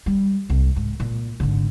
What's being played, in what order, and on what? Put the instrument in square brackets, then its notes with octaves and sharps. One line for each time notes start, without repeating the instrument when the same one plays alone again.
[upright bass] G3
C2
G#2
A#2
G#1 D3